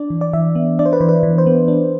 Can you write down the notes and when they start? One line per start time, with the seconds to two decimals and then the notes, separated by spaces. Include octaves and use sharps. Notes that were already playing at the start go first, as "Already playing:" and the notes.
Already playing: D4 D5
0.10 E3
0.21 D5
0.33 E3 E5
0.55 B3
0.79 D4 D5
0.86 C5
0.93 B4
1.00 E3 C5
1.09 B4
1.23 E3
1.38 C5
1.46 B3
1.68 D4